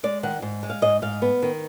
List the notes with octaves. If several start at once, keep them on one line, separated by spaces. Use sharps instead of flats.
G#3 D5
D#3 F#5
G#2
G#3
F5
G#2 D#5
G#2 F5
B3
D#3